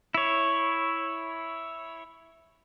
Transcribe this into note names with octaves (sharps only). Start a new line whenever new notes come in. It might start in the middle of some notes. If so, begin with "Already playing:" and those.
E4 C#5